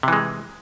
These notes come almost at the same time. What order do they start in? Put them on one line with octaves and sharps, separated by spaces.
C3 E3 G#3